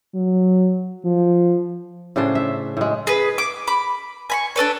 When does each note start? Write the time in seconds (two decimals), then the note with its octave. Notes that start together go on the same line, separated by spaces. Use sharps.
0.15 F#3
1.05 F3
2.16 A2 C#3 D4 C5
2.35 E5
2.77 A2 G#3
3.07 G#4 B4
3.38 D6
3.67 B5 D6
4.30 G#5 B5 C#6
4.56 D4 A4 B4 C#5